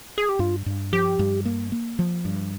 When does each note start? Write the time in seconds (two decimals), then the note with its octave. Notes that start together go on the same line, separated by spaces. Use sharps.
0.18 G#4
0.29 G4
0.39 G2 F4
0.66 G2
0.93 F3 G4
1.19 G2
1.45 A#3
1.72 A#3
1.99 F3
2.25 G2